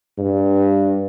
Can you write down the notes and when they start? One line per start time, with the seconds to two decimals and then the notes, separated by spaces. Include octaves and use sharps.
0.18 G2